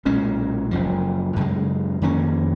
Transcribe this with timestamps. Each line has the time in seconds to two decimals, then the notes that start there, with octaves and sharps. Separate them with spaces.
0.05 B1 A#2 G#3 C#4
0.71 F#1 F#2 F3
1.36 F#2 C#3 G#3
2.02 F2 D#3 A#3 C#4